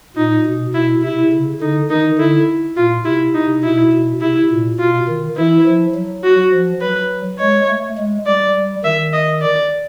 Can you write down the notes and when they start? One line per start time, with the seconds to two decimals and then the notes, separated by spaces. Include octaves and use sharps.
0.16 A#2 D#4
0.46 B2
0.75 B2 E4
1.03 C3 E4
1.33 C#3
1.62 D3 D#4
1.90 D#3 D#4
2.19 D3 E4
2.77 A#2 F4
3.05 C3 E4
3.35 D#4
3.64 B2 E4
3.93 B2
4.22 C3 E4
4.50 A#2
4.80 B2 F4
5.08 D#3
5.37 E3 E4
5.66 F3
5.95 F#3
6.24 F#4
6.52 F3
6.81 F#3 B4
7.39 G#3 C#5
7.69 A3
7.97 G#3
8.26 G3 D5
8.55 G3
8.84 D#3 E5
9.13 D#5
9.42 D5